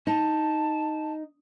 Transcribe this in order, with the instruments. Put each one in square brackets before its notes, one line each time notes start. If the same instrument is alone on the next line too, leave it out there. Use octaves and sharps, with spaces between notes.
[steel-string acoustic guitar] D#4 [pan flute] A5